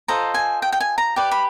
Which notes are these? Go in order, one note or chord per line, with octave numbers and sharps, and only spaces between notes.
F4 A4 C5 D#5 A#5
G#5
G5
G5
G#5
A#5
G4 B4 D5
B5